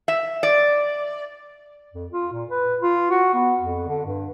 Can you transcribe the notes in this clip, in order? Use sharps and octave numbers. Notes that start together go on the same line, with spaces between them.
E5
D5
F2
F4
A#2
B4
F4
F#4
B3
F2
D3
G2